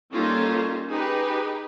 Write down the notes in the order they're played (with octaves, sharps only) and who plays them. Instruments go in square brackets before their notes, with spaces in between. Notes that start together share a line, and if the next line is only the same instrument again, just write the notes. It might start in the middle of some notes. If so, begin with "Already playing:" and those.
[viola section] G3 A#3 C#4 D#4 F4 A4
D#4 G4 G#4 B4